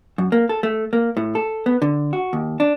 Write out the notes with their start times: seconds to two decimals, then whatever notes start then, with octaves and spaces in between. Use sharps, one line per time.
0.18 F#2
0.32 A#3
0.49 A4
0.63 A3
0.93 A#3
1.17 A2
1.35 A4
1.66 B3
1.82 D3
2.13 F#4
2.33 D#2
2.60 D4